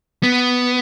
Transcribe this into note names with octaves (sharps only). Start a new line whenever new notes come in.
B3